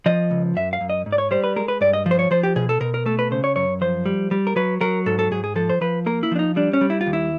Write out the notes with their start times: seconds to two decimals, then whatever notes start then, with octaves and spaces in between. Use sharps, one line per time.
0.06 F3 D#5
0.31 C#2
0.56 F#2 E5
0.73 F5
0.81 F#2
0.90 D#5
1.06 G#2
1.12 D5
1.18 C#5
1.31 G3 C5
1.44 B4
1.56 G#3 A#4
1.68 B4
1.81 G2 D5
1.93 D#5
2.06 F3
2.11 C5
2.19 C#5
2.31 F3 C5
2.43 G4
2.56 B2 G#4
2.69 A4
2.80 B2 A#4
2.94 A#4
3.06 A3 A4
3.19 B4
3.31 C#3 C5
3.44 C#5
3.56 F#2 C#5
3.81 F3 C5
4.06 G3
4.31 G3
4.47 A#4
4.56 F#3 B4
4.81 F#3 A#4
5.06 G#2 A4
5.19 A4
5.31 G#2 G#4
5.44 G#4
5.56 F3 A4
5.70 C5
5.81 F3 B4
6.06 A#3 A#4
6.23 E4
6.32 F3 D4
6.39 D#4
6.56 G3 D4
6.73 C#4
6.81 G3
6.90 E4
7.01 F4
7.06 D#2
7.13 E4